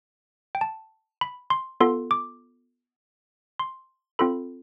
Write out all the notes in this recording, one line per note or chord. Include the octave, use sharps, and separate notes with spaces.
G5
A5
B5
C6
B3 F4 A4 C6
D6
C6
C4 F4 A4 B5